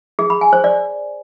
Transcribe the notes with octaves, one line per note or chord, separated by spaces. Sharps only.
G#4
B5
G#5
C5
D5